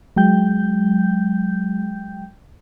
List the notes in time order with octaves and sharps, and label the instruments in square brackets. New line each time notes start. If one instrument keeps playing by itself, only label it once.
[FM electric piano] F#3 G#3 G5 G6